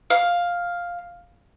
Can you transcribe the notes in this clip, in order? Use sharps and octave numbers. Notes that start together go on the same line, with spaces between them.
F5